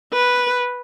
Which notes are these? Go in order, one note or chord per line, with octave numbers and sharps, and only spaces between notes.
B4